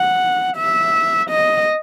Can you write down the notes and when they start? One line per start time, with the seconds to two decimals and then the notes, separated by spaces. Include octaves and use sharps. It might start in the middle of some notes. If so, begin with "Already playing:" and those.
Already playing: F#5
0.57 E5
1.30 D#5